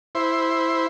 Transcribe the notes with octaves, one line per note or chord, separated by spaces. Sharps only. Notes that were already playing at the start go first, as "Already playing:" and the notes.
E4 C5